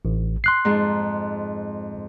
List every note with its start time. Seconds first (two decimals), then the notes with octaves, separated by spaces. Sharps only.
0.05 A1
0.44 C6 F#6 C7
0.65 F2 G#2